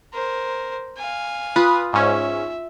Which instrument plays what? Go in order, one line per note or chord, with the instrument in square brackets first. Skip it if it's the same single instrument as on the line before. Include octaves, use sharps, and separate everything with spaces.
[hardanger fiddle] A#4 C5
F5 G#5
[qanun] F4 [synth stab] B4 D#6
[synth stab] G#2 C#4 [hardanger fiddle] E5